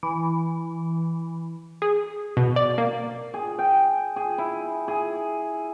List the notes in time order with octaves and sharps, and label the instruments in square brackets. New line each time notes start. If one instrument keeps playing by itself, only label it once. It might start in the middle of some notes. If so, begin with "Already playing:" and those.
[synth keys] E3
[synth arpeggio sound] G#4
B2
D5
A#3
[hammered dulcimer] G#4
G5
G#4
E4
G#4